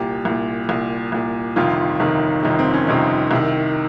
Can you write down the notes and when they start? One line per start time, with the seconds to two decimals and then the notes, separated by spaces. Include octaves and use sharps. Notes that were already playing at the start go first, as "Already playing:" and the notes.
Already playing: C2 A#2 G4
0.25 C2 A#2
0.69 C2 A#2
1.12 C2 A#2
1.56 G1 F2 C3 D#3 F4
2.00 G1 F2 C3 D#3
2.43 G1 F2 C3 D#3 D#4
2.59 C4
2.74 C#4
2.87 G1 F2 C3 D#3 D#4
3.31 C2 C3 D#3